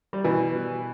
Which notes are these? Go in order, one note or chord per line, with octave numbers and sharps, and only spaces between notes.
G3
B2 E3